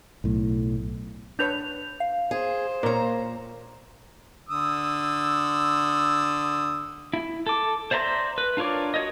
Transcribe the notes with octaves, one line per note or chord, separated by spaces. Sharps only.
B1 A2
D4 B4 C#5 G6 F7
F5
G#4 C5
A#2 A#4 C#5 A#5
D3 D#6 E6
E4
A4 D6
C5 D5 E5 A#5 C6
B4
D4 F4 A#4 C#5 D5
F#4 C#5 D#5